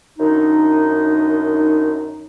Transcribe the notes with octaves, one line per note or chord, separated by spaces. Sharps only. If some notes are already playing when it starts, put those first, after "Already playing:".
F#2 D#3 D4 D#4